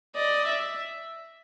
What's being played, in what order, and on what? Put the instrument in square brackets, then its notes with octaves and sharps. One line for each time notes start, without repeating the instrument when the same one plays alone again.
[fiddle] D5 [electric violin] D#5
[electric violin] E5